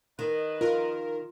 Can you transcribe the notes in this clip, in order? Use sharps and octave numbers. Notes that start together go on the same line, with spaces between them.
D#3 B4 D#5
F4 A#4